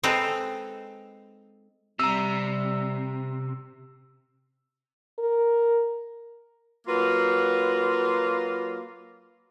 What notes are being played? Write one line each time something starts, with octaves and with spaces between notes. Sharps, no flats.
G#3 C4 D#4 A4 B4 A#5
C3 G3 A#5 E6
A#4
F#3 A#3 F4 F#4 B4